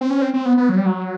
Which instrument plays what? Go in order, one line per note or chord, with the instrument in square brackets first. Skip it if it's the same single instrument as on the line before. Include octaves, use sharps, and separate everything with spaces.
[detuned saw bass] C4
C#4
C4
C4
B3
B3
F#3
G3
F#3